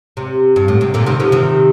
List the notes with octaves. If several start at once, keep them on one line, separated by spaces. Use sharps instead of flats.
C3
G2
A2
C3
A#2 D3
C3 D#3
D3 F3
C3 D#3